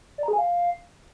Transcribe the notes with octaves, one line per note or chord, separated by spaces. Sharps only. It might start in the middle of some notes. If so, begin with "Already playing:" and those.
D5
A#5
G#4
G#5
F5